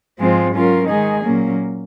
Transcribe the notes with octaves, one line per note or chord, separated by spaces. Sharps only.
G#2 F3 G#3 C4 F4
F#3 C#4 F4 A#4
D#3 G#3 D#4 G#4
A#2 F#3 A#3 C#4